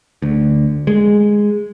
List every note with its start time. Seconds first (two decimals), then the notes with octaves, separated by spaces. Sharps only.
0.22 D2
0.87 G#3